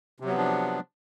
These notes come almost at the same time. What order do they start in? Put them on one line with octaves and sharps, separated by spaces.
C3 F#3 B3 F3 D4